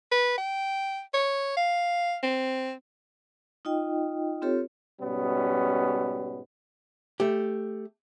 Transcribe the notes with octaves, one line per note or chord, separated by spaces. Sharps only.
B4
G5
C#5
F5
C4
D#4 F4 D#5 G5
C4 F4 G4 A4 C#5
G#2 B2 G3 B3 C#4
A3 G4